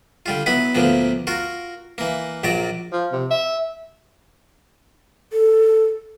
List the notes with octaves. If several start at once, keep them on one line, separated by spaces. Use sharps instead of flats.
D3 G3 F4
F#3 B3 E4 B4
D2 A#2 D3 F3 B3
F4 F#4 A#4
E3 A#3
A#1 A#2 F#3 D5 A#5
F3
C3
E5
A4